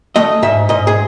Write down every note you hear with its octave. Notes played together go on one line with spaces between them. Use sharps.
A3 D#5
G#2 E5
G#2 D#5
G#4